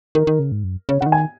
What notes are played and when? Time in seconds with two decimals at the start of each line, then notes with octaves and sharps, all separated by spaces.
0.15 D#3 A#4
0.27 D#3
0.39 C#3
0.52 G#2
0.64 F#2
0.89 C#3 C#5
1.01 C#3 F#5
1.06 D#3
1.12 G#5